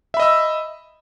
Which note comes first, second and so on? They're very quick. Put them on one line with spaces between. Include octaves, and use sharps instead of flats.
E5 B5 D#5 E6